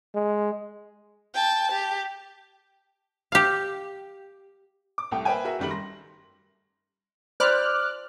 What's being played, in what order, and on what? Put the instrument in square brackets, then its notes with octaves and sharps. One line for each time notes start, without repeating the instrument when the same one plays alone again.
[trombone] G#3
[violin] G5 A5
G4
[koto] G4 F5
[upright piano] D6
C2 A3 G5
A#3 B4 C5 E5 G5 G#5
F#4 G#4 A#4 E5
F#1 D#3 G3 A3 F#7
C6 A#6
[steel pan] C5 D5 B5 [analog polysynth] D6 F6 F#6